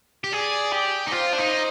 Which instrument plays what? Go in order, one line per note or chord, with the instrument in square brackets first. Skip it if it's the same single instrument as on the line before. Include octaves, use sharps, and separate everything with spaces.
[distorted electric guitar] G4
[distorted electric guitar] G#4 [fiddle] D5
[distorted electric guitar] G4
D#4
[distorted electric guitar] F4 [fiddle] C5
[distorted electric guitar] D4
D#4